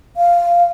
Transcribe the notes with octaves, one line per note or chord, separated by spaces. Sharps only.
F5